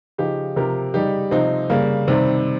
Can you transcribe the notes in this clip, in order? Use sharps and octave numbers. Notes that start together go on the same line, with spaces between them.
C#3 F3 D#4 G4
C3 F3 G4 A#4
C#3 G3 D#4 G4
C3 F3 C4 D#4
C#3 G3 A#3
C3 D#3 G3 C4